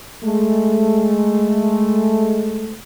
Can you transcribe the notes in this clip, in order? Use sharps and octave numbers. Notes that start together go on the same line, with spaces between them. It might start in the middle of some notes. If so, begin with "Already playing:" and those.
G#3 A3